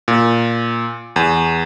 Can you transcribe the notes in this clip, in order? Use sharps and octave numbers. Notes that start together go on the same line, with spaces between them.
A#2
E2